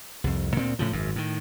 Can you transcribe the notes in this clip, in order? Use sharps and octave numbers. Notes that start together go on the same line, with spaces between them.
C2 F2
D2 A#2 C4
A2 C#3 F3
G#1 F#2
A2 D#3